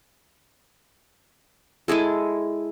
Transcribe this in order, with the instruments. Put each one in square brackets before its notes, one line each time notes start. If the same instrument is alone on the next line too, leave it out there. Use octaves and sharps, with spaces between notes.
[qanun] G#3 E4 G#4 A4